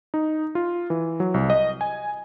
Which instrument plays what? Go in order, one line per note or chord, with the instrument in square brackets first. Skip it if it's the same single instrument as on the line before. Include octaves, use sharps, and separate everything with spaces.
[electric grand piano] D#4
F4
E3
F#3
C2
D#5
G#5